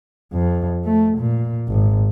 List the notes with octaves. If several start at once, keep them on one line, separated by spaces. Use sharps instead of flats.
F2
A3
A#2
G#1